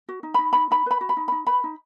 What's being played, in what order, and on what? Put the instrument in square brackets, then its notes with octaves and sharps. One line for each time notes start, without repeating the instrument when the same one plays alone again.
[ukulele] F#4
D#4
D#4 B5
D#4 B5
D#4 B5
B4 B5
F#4
B5
D#4
D#4 B5
B4 B5
D#4